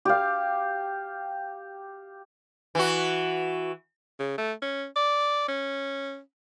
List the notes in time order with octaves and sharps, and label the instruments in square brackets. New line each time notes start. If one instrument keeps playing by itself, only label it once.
[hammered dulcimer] G4 F5
[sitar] E3 F#4
[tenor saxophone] C#3
A3
C#4
D5
C#4